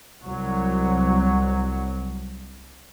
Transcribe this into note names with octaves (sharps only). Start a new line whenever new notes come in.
C2 F#3